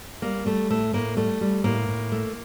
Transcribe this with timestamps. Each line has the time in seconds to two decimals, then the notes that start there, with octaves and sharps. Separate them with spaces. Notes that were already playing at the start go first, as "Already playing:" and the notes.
0.22 G3 A#3
0.46 G3 A3
0.70 A2 A3
0.93 A2 A#3
1.17 G3 A3
1.41 G3
1.64 A2 A#3
1.88 A2
2.12 A3